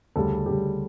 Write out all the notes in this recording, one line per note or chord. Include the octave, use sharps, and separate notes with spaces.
D2 C#3 G3 A4
D2 C#3 G3 G4